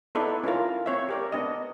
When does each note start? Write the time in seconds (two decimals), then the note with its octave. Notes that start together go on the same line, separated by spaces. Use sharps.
0.15 B3 D#4 E4 A4 B4 D5
0.44 C#4 E4 F4 A#4
0.86 C4 C#5 E5
1.09 G4 A#4 D5
1.32 B3 D4 D#5